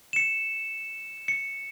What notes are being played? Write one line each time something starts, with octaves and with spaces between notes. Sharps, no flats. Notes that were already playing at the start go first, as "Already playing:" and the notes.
C#7 E7
C#7